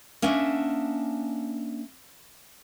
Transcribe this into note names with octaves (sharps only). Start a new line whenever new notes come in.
A#3 C#4 D4 D#5 E5 F#5